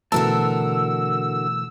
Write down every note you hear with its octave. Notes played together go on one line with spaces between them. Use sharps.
B2 D3 E3 A3 F#4 A#4 A5 E6